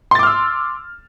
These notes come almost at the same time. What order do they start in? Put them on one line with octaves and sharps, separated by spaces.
C6 A6 D6 F6 E6